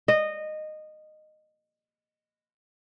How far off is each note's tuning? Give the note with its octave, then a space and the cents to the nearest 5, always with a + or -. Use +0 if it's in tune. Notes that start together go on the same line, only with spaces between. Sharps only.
D#5 -15